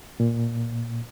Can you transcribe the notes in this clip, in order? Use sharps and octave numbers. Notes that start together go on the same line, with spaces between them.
A#2